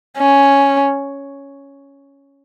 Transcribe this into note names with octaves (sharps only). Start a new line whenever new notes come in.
C#4